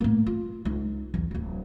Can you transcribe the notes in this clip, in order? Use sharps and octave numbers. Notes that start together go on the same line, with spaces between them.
A2 A#3
F4
C#2 D#4
B1 E2
D1 C4